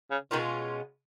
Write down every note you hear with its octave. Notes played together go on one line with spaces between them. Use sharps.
C#3
B2 D#3 G#3 C#4 F4